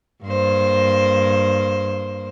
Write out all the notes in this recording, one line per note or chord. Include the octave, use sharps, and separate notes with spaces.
G2 A#3 C5